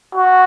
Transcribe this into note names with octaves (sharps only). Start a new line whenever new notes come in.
F#4